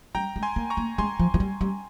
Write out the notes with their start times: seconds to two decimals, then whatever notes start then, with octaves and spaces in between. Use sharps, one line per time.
0.15 G3 G5 A#5
0.36 G#3
0.43 G#5 C6
0.56 A#3
0.70 A#5 C#6
0.77 A#3
0.98 G#3 G#5 C6
1.19 F3
1.34 F3
1.40 G3
1.61 G3